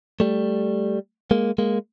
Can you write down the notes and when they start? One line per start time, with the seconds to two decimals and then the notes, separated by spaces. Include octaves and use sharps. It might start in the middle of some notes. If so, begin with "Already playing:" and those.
0.20 G3 A3
1.31 G#3 A#3
1.58 G#3 A#3